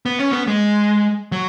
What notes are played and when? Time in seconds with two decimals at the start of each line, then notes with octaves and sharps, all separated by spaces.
0.06 B3
0.19 C#4
0.31 B3
0.48 G#3
1.32 F#3